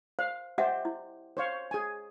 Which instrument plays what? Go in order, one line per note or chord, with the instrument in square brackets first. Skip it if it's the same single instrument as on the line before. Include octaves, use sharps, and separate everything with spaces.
[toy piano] C5 [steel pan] F5
[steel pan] G4 C5 [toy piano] D#5 E5 F#5
[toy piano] E4
[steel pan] C5 C#5 F5
G#4 G#5